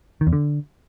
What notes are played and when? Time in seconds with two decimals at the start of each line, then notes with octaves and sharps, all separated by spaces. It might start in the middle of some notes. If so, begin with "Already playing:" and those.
0.21 D#3
0.27 E2
0.33 D3